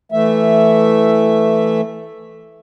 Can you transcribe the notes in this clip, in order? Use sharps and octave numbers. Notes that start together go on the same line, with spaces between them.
E3 A3 E5